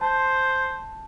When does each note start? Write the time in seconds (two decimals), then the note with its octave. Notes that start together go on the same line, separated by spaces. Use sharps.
0.01 C5 A5